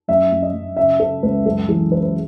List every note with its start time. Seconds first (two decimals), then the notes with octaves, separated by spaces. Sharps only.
0.08 F#2 E5
0.32 F#2
0.42 D#5
0.54 F#2
0.77 C#3 E5
1.00 C#3 A4
1.23 C#2 B4
1.46 F#2 A4
1.68 E3 G#4
1.90 E3 B4
2.03 B4